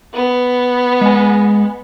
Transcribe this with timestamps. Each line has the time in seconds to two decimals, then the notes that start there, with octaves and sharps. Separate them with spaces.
0.14 B3
1.01 G#3 G#5